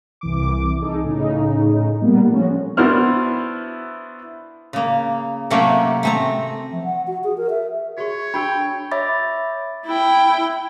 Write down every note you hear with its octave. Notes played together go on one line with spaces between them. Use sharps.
C2 E3 D6
D#4 G#4 A4
A2 C#3 D#4
A#2 G3 A#3 B3
F3 A3 C#4 F#4
B3 D4 E4 F#4 C5 F6
C#3 A#3
C3 F#3 A3 A#3 C#4 G4
A3 C4 A#5
F3
F#5
F#4
G#4
A#4
E5
F#4 G#4 C#5 C#6
D4 F#4 G5 B5 E6
C#5 E5 B5 D6 A6
E4 G5